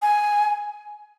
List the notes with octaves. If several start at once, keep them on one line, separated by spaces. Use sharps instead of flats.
G#5